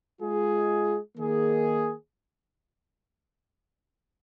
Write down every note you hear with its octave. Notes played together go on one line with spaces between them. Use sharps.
G#3 F4 G#4
D#3 A#3 G#4